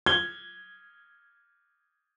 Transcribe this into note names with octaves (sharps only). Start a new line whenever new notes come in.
G#6 G7